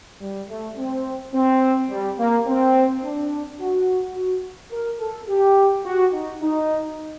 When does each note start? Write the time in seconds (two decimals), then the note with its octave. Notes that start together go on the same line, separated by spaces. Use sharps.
0.21 G3
0.49 A3
0.77 C4
1.34 C4
1.90 G3
2.18 A#3
2.47 C4
3.03 D4
3.60 F#4
4.16 F#4
4.72 A#4
5.00 A4
5.28 G4
5.85 F#4
6.13 D#4
6.42 D#4